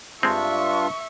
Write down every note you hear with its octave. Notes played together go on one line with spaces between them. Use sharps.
G2 G#3 C4 D4 F4 E5 C#6